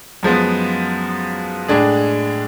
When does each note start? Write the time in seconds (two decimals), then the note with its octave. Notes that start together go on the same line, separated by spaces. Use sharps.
0.23 F#2 F3 G#3 B3
1.68 A2 G#3 D4 G#4